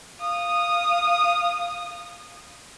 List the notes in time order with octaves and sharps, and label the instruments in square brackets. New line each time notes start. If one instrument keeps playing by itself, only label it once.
[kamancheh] F5 D#6